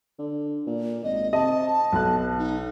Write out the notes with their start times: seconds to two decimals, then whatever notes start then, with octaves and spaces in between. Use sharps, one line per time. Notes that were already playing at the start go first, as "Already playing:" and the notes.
0.19 D3
0.66 A#2
1.04 G#1 D#5
1.33 C3 D#5 A5
1.92 B1 B2 F#6
2.39 D#4